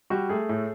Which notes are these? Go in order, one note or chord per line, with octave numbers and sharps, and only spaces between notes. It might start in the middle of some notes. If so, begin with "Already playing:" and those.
G3 F#4
A3 G#4
A2